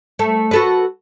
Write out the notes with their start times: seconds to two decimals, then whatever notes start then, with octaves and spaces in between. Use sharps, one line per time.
0.19 A3
0.51 F#4 A4 B4